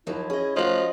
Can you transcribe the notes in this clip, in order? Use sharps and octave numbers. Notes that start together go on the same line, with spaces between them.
D#2 F3 F#3 E4
C#4 G#4 D#5
F3 A3 F#4 D#5